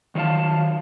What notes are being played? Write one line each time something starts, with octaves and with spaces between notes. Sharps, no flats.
D#3 F#3 C5 F5 A5